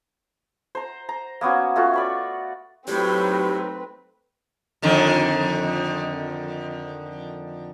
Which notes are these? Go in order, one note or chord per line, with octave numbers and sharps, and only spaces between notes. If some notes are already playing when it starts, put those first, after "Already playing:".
C5 A#5
A#5
A#3 B3 C#4 F#4
A3 C#4 F4 F#4
D5 B5 C#6
A2 F#3 A3 C4 D#4 G4 B4
F2 D3 D#3